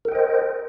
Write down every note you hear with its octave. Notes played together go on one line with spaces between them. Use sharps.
A#4 C5 D#5 G5